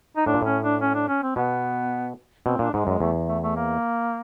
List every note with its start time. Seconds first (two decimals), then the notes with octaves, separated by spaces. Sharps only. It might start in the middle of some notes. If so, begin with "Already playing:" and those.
0.17 D#4
0.26 A2 D4
0.34 A#2
0.42 A2 C#4
0.63 D4
0.81 C#4
0.94 D4
1.08 C#4
1.23 C4
1.36 B2 B3
2.46 B2 C4
2.59 A#2 D4
2.73 G#2 G#3
2.87 F#2 G#3
3.00 E2 A3
3.28 A3
3.43 A3
3.56 A#3